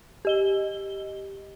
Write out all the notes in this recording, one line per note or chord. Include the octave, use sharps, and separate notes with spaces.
G4 D#5 G7